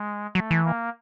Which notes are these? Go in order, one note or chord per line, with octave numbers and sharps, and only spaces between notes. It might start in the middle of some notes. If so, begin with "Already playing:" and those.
Already playing: G#3
F#3 A3
E3
A#3